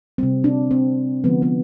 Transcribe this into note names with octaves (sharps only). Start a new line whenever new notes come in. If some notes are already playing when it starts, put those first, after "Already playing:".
C3 G3 C4
D4
C4
D3 F3 G#3 B3
B3